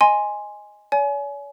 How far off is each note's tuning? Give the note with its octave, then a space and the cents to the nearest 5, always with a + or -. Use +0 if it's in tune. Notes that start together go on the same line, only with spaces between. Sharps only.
D#5 +0 G#5 +0 C6 +0
C#5 +45 G#5 +25